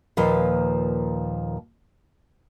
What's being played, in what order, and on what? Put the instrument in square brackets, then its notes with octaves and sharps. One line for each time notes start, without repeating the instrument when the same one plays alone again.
[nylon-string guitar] D#2 A#2 F3 B4 F5